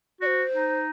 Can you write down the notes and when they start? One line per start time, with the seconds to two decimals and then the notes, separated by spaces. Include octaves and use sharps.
0.21 F#4 D5
0.26 C5
0.54 D#4